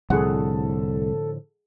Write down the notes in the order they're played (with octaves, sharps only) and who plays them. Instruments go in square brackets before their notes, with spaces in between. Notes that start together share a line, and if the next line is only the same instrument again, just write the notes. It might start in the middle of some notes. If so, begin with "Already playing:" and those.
[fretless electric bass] C2 [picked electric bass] A2 D3 F3 [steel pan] G#4 F#5 [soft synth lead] A4